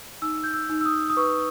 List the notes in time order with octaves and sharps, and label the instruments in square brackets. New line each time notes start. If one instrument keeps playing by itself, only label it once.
[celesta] D#4 E6
G6
E6
D#4
E6
D#6
D#6
B4 C#6